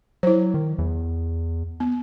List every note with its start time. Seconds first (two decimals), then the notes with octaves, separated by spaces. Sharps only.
0.23 F#3 E4 C5
0.54 D#3
0.79 E2
1.80 B3